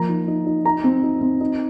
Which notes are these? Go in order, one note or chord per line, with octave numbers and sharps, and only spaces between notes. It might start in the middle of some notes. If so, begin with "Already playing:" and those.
Already playing: F3 A#3 A#5
D#4
D#4
D#4
D#4 A#5
C4
D#4
C4
D#4